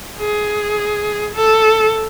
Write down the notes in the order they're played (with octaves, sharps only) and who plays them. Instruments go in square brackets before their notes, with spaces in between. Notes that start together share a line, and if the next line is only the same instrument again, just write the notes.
[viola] G#4
A4